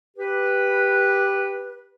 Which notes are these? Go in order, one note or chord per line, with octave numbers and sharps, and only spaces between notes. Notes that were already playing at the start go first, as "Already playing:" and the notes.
G4 B4